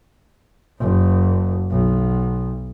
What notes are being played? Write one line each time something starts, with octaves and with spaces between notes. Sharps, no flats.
F#1
B1